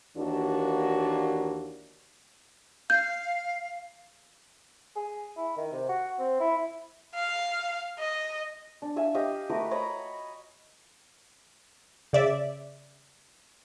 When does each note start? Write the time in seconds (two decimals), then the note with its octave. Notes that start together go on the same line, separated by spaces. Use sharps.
0.16 D#2 E3 A#3 D4 F#4
2.90 F5 G6
4.96 G#4
5.37 E4
5.56 D#3
5.72 C3
5.89 F#4
6.19 C4
6.40 E4
7.15 F5
7.99 D#5
8.82 D4
8.96 E5 F5 G#5
9.15 G4 D#5 F5
9.50 A3 F#4 A#4 B4
9.71 C#5 D#5 A#5 B5
12.13 C#3 D5 E5